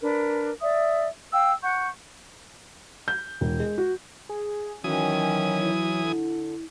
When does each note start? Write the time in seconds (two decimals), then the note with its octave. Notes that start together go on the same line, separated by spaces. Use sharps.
0.01 D4 A#4 B4
0.61 D5 E5 D#6
1.32 F5 G5 E6
1.62 F#5 C#6 G6
3.08 G6
3.41 E1
3.60 G#3
3.78 F#4
4.29 G#4
4.84 D#3 E3 F#3 C#4 G#5 D#6
5.62 E4
5.98 D3